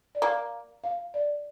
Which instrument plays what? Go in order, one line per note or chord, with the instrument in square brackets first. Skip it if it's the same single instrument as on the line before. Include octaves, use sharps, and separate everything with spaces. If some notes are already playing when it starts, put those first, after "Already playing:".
[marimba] D5
[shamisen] A#3 [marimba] F5
[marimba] F5
D5